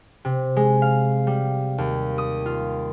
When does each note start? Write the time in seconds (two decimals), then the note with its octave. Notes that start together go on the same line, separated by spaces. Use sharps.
0.25 C3
0.56 G#3
0.82 F5
1.27 G3
1.78 D#2
2.18 D#6
2.46 F4